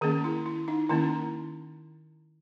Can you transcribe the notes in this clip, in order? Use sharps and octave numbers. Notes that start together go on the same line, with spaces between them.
D#3 A#3 C#4 G#4
E4
E4
D#4
D#3 A#3 C#4 E4